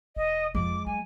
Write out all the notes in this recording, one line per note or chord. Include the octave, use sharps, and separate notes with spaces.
E1 D#5
F2 F3 G#3 D6
F#3 G#5